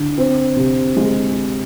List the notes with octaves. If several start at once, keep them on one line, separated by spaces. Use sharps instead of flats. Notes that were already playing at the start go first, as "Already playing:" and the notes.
Already playing: D3
C4
C3
G#3